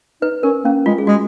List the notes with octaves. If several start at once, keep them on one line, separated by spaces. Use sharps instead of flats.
D#4 B4
C#4 A#4
A#3 C#4
G#3 F4
G#4
G#3 F#4